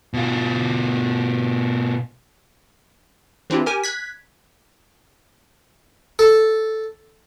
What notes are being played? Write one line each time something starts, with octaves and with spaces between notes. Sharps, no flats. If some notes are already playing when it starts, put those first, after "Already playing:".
B2 F4
E3 C4 D4 E4 F4 G4
G4 A#4 G#5
F#6 G#6 B6
A4